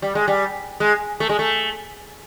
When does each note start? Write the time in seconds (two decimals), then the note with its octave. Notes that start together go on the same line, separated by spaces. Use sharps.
0.02 G3
0.15 G#3
0.28 G3
0.80 G#3
1.20 A3
1.29 G#3
1.39 A3